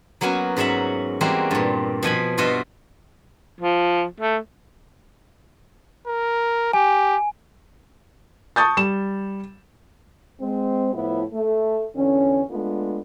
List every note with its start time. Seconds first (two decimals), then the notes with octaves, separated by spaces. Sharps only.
0.21 F#3 A#3 B3 C#4 F#4
0.57 G#2 F#3 C#4 E5 F#5
1.21 E3 G3 G#3 A#3 C4 F#4
1.51 G2 A#2
2.03 B2 F3 G#5 B5
2.38 G2 B2 F4 F#4 D#5 E5
3.60 F3
4.20 A3
6.07 A#4
6.73 G4 G#5
8.56 A5 C#6 D#6 G6 A6
8.77 G3 E7
10.41 G#3 C4
10.94 A2 F3 B3 E4
11.33 A3
11.96 E2 D3 C#4
12.51 G#3 A3 B3 D4 F4